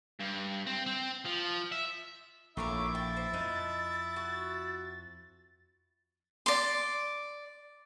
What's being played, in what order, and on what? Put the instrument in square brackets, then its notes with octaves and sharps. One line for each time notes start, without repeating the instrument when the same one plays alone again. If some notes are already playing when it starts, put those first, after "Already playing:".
[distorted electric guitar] G2
C4
C4
F3
E5
[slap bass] A#1 [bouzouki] A3 A#4 C#5 [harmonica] E4 E5 [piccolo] D6
[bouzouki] G5 [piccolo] A6
[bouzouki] C5
[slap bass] F2 [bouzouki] D#4
[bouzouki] F#4
[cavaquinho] D5 C6